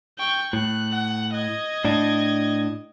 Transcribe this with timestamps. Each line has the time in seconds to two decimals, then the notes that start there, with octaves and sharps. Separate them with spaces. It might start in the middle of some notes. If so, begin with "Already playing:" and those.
0.19 G5 C#6
0.53 A2 F#6
0.92 F#5
1.33 D#5 G#6
1.85 A2 D4